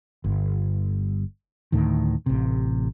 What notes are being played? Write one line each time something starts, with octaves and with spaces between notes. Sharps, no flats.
G1
D2 A2 D#3
A1 C3